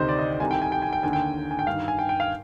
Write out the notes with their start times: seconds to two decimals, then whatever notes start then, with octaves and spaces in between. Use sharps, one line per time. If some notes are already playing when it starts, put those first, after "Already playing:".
Already playing: D2 C3 D#3 C5 D#5
0.09 D5
0.19 D#5
0.40 C2 C3 D#3 G#5
0.51 G5
0.62 G#5
0.72 G5
0.82 G#5
0.93 G5
1.03 D#2 D3 G#5
1.13 G5
1.51 G#5
1.59 G5
1.67 G2 D#3 F5
1.88 G#5
1.99 G5
2.09 G5
2.20 F5